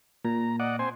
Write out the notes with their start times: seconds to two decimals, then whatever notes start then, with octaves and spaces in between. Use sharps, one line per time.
0.25 A#2 A#5
0.60 D5 D#5 F#5
0.79 C4 C5 G#5